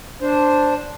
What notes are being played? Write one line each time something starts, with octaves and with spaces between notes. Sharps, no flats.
D4 C5